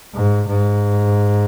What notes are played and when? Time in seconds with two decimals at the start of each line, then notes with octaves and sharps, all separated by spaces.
0.14 G#2
0.48 G#2